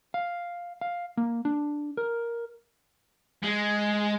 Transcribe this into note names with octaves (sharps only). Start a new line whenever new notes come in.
F5
F5
A#3
D4
A#4
G#3